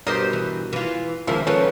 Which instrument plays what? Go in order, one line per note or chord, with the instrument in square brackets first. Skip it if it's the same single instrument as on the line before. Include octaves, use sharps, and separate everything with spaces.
[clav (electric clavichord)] G2 B2 A#4 [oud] G4 C5 D#5
[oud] E3
E3 F4
[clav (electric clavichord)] C#2 F3 E5 [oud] D#3 A#3
[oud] D#3 B3 [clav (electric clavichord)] F3 C#4 A4